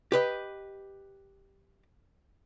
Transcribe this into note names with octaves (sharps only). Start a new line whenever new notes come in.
G4 B4 D#5